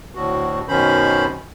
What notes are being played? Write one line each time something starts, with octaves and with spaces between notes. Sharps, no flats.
D2 A2 F#4
F#2 B2 D#3 C#4 C5 B5